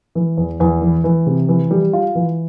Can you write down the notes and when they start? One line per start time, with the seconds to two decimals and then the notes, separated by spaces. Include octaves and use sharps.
0.15 E3
0.37 E2
0.60 E2
0.82 E3
1.04 E3
1.26 C3
1.49 E3
1.71 G3
1.93 F4
2.15 E3